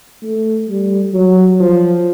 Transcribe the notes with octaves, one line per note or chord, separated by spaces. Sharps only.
A3
G3
F#3
F3